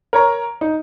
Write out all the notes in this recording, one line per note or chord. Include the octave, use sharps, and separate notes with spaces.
A#4 C#5 A#5
D#4